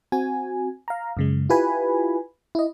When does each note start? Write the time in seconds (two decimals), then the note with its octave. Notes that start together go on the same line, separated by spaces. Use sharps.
0.12 C4 F#4 G#5
0.88 F5 A#5
1.17 F#2 C#3 G#3
1.50 E4 F4 G4 B4 G#5 B5
2.55 E4 D#5